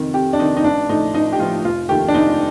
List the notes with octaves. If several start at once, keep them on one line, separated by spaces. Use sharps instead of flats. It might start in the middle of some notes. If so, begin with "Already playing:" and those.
Already playing: F2 C3 D#3
F2 G4
D4
C3 D#3 D#4
D#4
A1 D4
A2 F3 A3 D#4
A1 D#4
G4
A2 F3 A3 F4
F1 F4
D#2 D#3 A3 G4
D4
F1 D#4